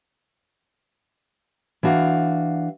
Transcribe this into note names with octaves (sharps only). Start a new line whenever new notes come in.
E3 D4 F#4 F5